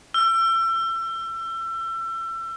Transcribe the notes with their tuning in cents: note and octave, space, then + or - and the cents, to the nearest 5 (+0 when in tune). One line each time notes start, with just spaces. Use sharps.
E6 +30